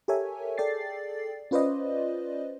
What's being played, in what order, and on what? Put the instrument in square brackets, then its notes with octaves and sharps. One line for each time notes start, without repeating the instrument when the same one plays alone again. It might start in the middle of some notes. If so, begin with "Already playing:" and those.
[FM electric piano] G4 A4 A#4 C#5 E5 G#5
G#4 A4 D5 G5 A6 C7
C#4 F4 B4 C5 D5 D#5